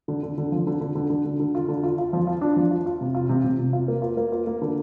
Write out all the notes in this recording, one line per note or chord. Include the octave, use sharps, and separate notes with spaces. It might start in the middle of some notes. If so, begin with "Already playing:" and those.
D3
D3
D3
F3
D3
D3
D3
D3
D3
D3
F4
D3
F4
F4
F3
F4
D4
F3
F4
F4
C3
F4
C3
C3
C3
F4
A#3
F4
A#3
F4
A#3
D3